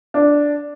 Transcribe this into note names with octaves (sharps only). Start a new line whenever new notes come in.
D4